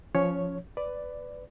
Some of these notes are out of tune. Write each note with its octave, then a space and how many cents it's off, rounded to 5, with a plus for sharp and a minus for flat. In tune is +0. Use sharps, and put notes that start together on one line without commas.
F3 +0 C#4 +15 C#5 +0
B4 +15 D5 +0